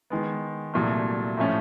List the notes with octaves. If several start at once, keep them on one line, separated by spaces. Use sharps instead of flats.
D#3 G#3 B3
C2 A#2 F#3 A3
A2 F3 A3 C#4